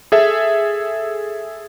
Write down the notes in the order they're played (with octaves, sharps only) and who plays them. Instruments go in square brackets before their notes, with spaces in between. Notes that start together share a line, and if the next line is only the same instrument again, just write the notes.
[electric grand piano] G#4 A4 E5